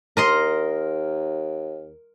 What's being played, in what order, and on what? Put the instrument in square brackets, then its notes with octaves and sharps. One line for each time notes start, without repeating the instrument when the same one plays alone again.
[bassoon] D#2 [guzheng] A#4 D#5 C6